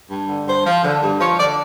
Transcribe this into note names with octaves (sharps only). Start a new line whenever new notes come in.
G2
D3
G2 C5
F3
D3
G2
F3 C#5
D3 D5